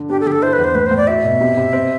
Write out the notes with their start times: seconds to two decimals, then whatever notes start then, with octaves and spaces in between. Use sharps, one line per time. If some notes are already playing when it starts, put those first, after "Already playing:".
Already playing: D3
0.09 D4 G4
0.20 A4
0.26 D3 G4
0.32 A4
0.42 E4 C5
0.53 B4
0.58 E2
0.64 C5
0.75 A2 B4
0.86 C5
0.91 A2
0.97 D5
1.07 F#4 E5
1.24 B2
1.41 C3
1.57 C3
1.73 C4